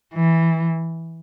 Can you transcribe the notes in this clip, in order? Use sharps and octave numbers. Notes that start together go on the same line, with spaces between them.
E3